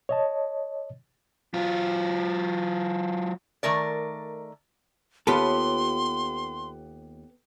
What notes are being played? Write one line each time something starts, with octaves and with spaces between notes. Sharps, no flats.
C#5 D#5 A5
F#3 F4
D#3 A3 A#4 D5
D#2 B3 F4 G4 A4 B4 C6